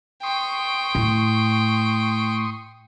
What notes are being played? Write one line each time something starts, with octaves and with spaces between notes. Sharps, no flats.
G5 C6 C#6 D#6
A2